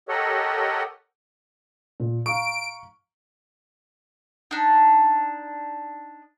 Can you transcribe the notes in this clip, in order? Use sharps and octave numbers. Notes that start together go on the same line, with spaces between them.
G4 A4 A#4 C#5 D#5 F#5
A#2
F5 A#5 C#6 D7
D4 D#4